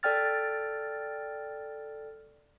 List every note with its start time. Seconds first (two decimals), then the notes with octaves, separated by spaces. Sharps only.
0.03 A4 D5 G5 F6 A6